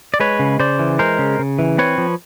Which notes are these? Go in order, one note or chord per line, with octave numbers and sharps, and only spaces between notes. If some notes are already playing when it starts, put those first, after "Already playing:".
D5
G#3 B4 C#5
C#3
C#3 C5 D5
E3
G#3 A#4 C5
C#3
C#3
E3
C4 B4 C#5
F3